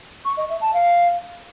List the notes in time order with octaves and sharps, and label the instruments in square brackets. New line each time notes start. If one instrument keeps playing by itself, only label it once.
[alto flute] C#6
D#5
E5
A5
F5